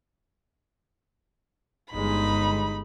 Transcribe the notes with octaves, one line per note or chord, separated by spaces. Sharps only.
G1 G#3 D#4 B5